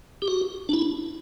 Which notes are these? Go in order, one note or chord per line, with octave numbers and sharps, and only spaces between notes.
G4
F#4
D4
E4